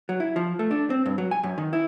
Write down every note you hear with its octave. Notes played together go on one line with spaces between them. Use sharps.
F#3
E4
F3
A3
D4
C4
G2
F#3
G#5
F#2
D#3
E4